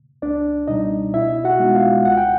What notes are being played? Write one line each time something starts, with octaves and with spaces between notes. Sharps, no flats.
C#2 D4 D5
B2 G3 D#4 D#5
B2 E4 E5
F#4 F#5
G#3 B3 D#4
F4 F5
C#2 F#5
G5